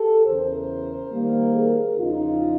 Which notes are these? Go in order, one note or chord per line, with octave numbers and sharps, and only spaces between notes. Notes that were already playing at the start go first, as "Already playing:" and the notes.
Already playing: G4 A4
E2 C#3 E3 A#4 C5
D#3 G3 A#3
G#4 A#4
E2 C#3 F3 D#4 F4